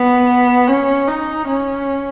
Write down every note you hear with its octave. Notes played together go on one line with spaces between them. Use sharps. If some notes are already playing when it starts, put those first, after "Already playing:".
Already playing: B3
C#4
D#4
C#4